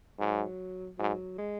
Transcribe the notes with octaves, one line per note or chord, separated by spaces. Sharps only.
G#2 F#3
G#2 F#3
G#3